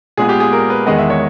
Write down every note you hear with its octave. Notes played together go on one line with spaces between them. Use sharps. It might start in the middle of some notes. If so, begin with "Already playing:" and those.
A#2 G#3 B3 G#4
G4
G#4
A#4
B4
E2 D#3 G#3 B3 D#5
E5
C#5